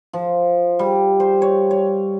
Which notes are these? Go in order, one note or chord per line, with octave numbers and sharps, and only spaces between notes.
F3
G3
C5
C#5
C#5